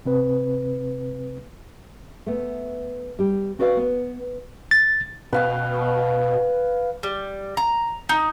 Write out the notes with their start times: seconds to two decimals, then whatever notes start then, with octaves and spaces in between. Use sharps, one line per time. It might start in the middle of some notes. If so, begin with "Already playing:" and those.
0.05 C3 C4 B4
2.26 A3 B3
3.19 G3 G4
3.59 C4 F#4 B4 D5 F5
3.77 B3
4.71 A6
5.33 B2 B4 F5 G5
7.03 G3
7.57 A#5
8.09 D#4